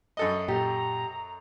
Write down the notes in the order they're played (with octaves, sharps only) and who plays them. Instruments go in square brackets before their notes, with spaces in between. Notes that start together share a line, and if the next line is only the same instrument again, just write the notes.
[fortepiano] F#2 A4 D#5
[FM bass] A#2 [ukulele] G4 [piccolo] A#5